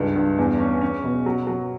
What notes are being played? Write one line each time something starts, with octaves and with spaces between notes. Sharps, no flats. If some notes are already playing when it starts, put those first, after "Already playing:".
Already playing: C#2 G2
G2
E2
C#4
C#4
B2
F#3
F#3